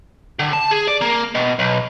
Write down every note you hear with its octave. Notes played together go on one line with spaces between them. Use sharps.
D3
A5
G#4
D5
A#3
B2
B1